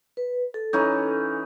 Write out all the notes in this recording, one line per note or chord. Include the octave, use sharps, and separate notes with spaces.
B4
A4
E3 C#4 D#4